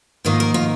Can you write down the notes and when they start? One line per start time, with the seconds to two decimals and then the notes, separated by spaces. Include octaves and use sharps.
0.25 G#2 D#3 A#3 D#4 F4
0.40 A#4
0.54 F4